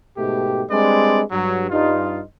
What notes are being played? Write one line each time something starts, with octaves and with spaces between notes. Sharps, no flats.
G#2 B2 A3 G4
G3 G#3 C4 D4 B4 D5
G2 F#3
G2 D#4 F4